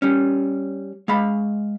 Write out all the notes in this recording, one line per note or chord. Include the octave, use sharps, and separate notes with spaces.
G3 C#4
G#3 F5 B5